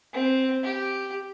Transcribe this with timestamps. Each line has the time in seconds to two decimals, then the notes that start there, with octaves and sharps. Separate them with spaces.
0.13 C4
0.63 G4